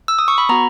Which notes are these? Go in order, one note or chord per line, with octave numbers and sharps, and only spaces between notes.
E6
D#6
C#6
B5
B3 F#4 A#5